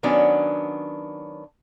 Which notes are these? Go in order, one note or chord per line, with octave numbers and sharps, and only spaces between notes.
D#3 F#3 B3 C#4 D4